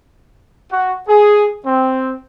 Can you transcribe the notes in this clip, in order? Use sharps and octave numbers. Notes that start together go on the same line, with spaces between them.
F#4
G#4
C4